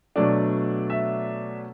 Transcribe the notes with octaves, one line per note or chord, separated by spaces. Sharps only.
B2 F#3 A3 D4 D5
E5